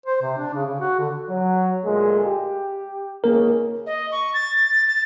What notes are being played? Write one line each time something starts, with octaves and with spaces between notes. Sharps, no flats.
C5
C3
D4
C#3
C#3
F#4
D3
F#3
D2 A#2 G#3
G4
G#1 C#2 C#3 A#3 A#4
D#5
C#6
A6
A6